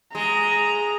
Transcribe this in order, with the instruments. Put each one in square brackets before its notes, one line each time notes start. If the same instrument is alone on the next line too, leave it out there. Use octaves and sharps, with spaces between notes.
[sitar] G#3 [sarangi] A#5